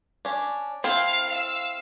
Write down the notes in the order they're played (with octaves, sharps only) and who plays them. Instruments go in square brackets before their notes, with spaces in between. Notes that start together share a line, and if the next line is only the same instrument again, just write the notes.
[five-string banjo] C#4 D4
[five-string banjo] C4 E4 A4 [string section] F5
[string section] F5 E6